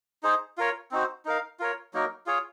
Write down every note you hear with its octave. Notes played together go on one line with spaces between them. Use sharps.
D#4 G#4 C5
F4 A#4 C#5
C4 D#4 F#4 C5
D#4 A#4 F5
F4 A#4 C#5
F#3 A#3 D#4 A#4
F4 G#4 C#5